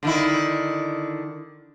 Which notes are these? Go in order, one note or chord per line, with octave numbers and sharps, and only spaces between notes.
D3 D#3 E4